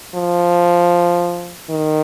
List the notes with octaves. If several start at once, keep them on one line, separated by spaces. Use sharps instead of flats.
F3
D#3